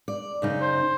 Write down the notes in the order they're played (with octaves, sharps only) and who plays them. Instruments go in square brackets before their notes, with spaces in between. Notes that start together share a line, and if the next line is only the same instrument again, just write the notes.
[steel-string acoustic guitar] D5
F#2 C#3 D#4
[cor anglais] C5